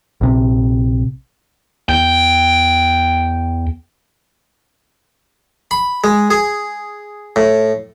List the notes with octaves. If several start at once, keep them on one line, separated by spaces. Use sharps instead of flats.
A#1 C3
E2 G5
B5
G#3
G#4
A2